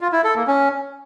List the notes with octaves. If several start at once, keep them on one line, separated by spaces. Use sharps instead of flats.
F4
E4
A4
A#3
C#4